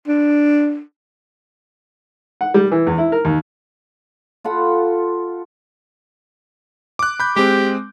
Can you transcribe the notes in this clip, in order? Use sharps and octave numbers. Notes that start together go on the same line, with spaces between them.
D4
F#5
G3
E3
E2
E4
A#4
D#2
F4 A4 F#5 B5
D6 F#6
B5 G6
G#3 C4 G4